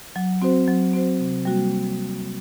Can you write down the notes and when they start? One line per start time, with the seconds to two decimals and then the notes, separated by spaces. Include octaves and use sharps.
0.16 F#3
0.42 C4 F#4 C5
0.67 F#3
0.93 C4 F#4 C5
1.19 C3
1.45 G3 A#3 F#4